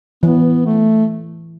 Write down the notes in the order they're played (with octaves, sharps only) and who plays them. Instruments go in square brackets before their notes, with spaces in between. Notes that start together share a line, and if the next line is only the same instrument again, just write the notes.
[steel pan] E3 [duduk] B3
[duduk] A3